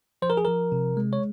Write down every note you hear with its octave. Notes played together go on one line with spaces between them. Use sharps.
F3 C5
A#4
G#4
F3 A#4
C3
G#3
C#5